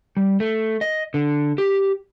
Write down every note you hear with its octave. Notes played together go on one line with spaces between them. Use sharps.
G3
A3
D#5
D3
G4